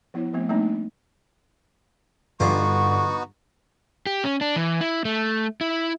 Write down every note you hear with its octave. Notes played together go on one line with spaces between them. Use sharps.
F3 B3 E4 C#5
F3 G#3 A3 B3 C4
G3 A3 A#3 C4 D4 D#4
G2 D3 B3 D#4 F4 F#4 C5 C#6
G4
C#4
D4
E3
E4
A3
E4